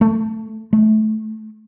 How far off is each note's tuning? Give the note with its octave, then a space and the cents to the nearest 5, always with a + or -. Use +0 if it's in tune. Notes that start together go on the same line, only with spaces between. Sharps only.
A3 +5
A3 -20